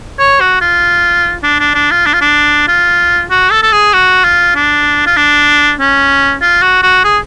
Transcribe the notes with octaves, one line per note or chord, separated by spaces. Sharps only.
C#5
F#4
F4
D4
D4
D4
F4
D4
F4
D4
F4
F#4
A4
A4
G#4
F#4
F4
D4
F4
D4
C#4
F4
F#4
F#4
G#4